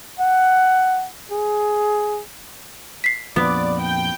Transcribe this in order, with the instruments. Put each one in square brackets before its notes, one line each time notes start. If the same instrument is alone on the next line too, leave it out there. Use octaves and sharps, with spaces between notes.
[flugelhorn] F#5
G#4
[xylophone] B6 C7
[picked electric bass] F2 A#2 F3 [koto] B3 [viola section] D5
[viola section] G5